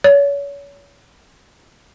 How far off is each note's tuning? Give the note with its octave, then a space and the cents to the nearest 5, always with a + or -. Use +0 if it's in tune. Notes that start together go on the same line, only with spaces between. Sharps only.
C#5 +35